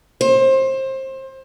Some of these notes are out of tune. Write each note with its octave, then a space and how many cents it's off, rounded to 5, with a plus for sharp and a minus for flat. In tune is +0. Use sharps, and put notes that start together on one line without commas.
C5 +25